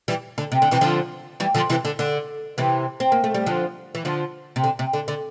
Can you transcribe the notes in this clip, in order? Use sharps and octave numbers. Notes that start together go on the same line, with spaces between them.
E3 G3
D3
C3
D3
C3 E3
D3 F3
E3 G3
D3 F3
C3 E3
D3
D3
C3 E3
C4
A#3
A3
G3
D3 F3
E3
D3 F3
C3
D3
C3
D3
D3